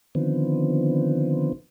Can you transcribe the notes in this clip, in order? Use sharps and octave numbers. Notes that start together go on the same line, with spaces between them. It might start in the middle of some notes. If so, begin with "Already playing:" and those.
D3 D#3 F3 B3 C4